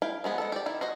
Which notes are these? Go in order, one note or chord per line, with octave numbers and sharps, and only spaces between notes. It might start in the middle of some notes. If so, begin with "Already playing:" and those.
E4 F5 G5
F3 G#3 B3 G#4
G#3 B3 A4
G4 D5
D#3 E4
F#4 C5 D#5